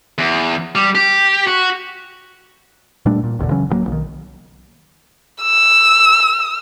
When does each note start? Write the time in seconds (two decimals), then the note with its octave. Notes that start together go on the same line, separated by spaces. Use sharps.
0.18 E2
0.75 G3
0.95 G4
1.47 F#4
3.06 A#2 G3 A3 D4
3.24 A#2
3.39 G1 D#2 A#2 D3
3.50 C#3 E3 F#3 C#4
3.69 D1 G2 F#3 A#3
3.88 B1 D#3
5.43 E6